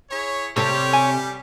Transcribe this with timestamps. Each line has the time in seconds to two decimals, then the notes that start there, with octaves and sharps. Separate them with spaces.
0.10 E4 G#4 C#5
0.57 C3 G3 G4 A4 C#5
0.93 G#5